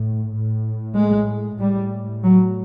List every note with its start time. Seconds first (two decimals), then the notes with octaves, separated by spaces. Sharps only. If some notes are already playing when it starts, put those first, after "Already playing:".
Already playing: A2
0.30 A2
0.94 G#3
1.58 A2 G3
2.23 F#3